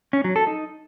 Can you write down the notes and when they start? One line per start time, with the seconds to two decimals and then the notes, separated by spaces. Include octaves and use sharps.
0.13 C#4
0.24 F#3
0.36 A4
0.47 D#4